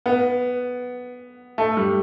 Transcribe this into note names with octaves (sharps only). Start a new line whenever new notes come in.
B3
A3
G3